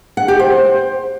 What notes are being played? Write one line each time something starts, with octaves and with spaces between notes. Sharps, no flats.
F#5
G4
C5